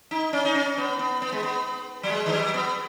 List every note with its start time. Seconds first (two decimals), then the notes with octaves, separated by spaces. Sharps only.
0.11 D#4
0.33 C#4
0.45 D#4
0.55 C#4
0.77 B3
0.99 B3
1.22 B3
1.32 G#3
1.43 B3
2.03 F#3
2.10 G#3
2.26 D#3
2.32 F#3
2.54 B3